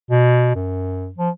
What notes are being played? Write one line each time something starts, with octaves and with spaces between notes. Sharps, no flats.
B2
F#2
F3